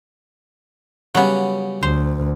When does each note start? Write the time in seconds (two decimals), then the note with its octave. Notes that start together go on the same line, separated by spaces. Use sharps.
1.15 C#3 F#3 G3 B3 C#4
1.83 D2 C5